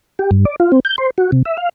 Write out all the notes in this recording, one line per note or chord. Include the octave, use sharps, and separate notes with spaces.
G4
G2
D5
F4
C4
G6
C5
F#4
C3
E5
F5